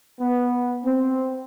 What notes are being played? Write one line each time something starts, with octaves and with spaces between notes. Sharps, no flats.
B3
C4